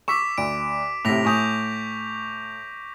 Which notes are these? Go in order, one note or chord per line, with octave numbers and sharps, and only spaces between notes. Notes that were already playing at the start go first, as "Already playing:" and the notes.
C#6 D6 E6 B6 E7
D2 D7
A2 C3 A#6 B6 F7
A2 G#5 C#6 D#6 G6 F7